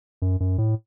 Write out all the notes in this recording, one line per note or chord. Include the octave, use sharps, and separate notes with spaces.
F#2
F#2
A2